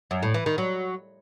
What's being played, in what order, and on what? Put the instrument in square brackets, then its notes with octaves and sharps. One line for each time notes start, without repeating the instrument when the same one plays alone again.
[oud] F#2
A2
E3
D#3
F#3